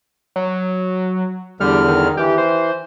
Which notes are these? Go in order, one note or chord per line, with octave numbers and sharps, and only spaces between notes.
F#3
E2 D3 G3 F6
D#3
E3 G4
C5